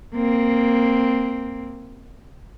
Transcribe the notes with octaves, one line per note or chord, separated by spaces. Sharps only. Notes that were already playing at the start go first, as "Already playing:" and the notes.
A#3 C4